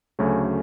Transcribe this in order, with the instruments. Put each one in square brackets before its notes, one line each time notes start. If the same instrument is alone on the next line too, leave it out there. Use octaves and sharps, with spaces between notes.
[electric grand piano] D2 C#3 F#3 A3 C#4